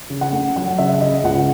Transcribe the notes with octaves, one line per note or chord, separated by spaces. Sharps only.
C#3
F#5
A3
F#3 F#5
C#3 E5
C#3 D#5
C#2 F#5